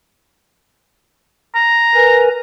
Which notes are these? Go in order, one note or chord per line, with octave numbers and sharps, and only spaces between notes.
A#5
A#4 B4 G#5